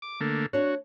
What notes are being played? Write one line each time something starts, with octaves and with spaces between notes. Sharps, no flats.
D6
D3 A3 A#3
D4 F#4 C#5